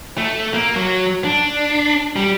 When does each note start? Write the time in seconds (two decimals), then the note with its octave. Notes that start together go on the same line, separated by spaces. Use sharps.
0.18 A3
0.54 A#3
0.76 F#3
1.24 D4
2.16 G3